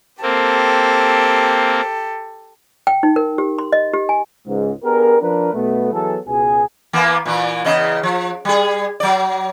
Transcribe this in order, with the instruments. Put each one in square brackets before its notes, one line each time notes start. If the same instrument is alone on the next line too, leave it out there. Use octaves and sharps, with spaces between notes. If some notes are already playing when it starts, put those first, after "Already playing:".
[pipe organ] A#3 C4 [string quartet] G4 A4
[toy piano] G5
D#4
A#4
G4
C6
D#5
G4
G#5
[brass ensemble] C#2 G#2
B3 D4 G4 G#4 A#4
F3 D4 A#4 B4
B1 B2 A3 B3
E3 F#3 B3 G#4 A4
C#2 B2 G#4 G#5
[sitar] E3 A#3 B3
A#2 E3
E2 C#3 D#5
F3
G3 G#4
F#3 D5